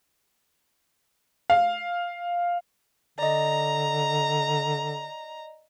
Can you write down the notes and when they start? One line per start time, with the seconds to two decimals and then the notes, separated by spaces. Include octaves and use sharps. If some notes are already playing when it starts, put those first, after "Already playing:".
1.50 F5
3.19 D3 D5 D#5 A#5